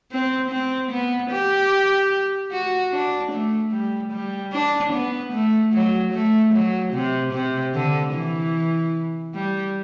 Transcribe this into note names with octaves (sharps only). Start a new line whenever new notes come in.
C4
C4
B3
G4
F#4
D4
A3
G3
G3
D4
B3
A3
F#3
A3
F#3
C3
C3
D3
E3
G3